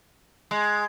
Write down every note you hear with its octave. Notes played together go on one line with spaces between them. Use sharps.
G#3